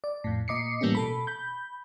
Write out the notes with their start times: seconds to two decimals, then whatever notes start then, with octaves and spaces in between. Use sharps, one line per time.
0.04 D5
0.24 F2 A2
0.48 A#2 D#5 D6 C7 C#7
0.81 A2 E3 G3 A#3 B3 C#4
0.95 B2 A4 B5
1.27 B5 G6